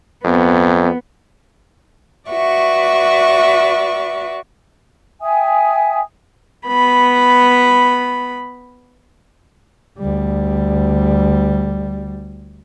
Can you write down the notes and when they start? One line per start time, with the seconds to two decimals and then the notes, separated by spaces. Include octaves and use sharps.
0.25 F2 B3
2.30 F#4 B4 D5 E5 C#6
5.21 E5 G5 G#5 D#6
6.67 B3 B5
9.99 D2 G3